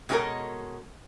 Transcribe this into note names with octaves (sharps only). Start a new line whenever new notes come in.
B2 G#3 C#4 G4 A4 A#4